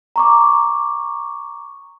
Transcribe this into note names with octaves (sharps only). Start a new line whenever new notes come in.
A#5 C#6 D6